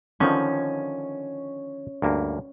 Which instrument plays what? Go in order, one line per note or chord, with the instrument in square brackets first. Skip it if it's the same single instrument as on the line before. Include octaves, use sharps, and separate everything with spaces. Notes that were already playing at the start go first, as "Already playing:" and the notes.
[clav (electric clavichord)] D3 D#3 F3 [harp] C#4
[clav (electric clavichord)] D2 G2 A#3